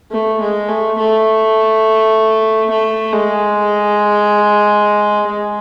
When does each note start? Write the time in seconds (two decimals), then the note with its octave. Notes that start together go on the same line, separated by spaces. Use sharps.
0.12 A3
0.41 G#3
0.69 A3
0.98 A3
2.71 A3
3.13 G#3
5.28 G#3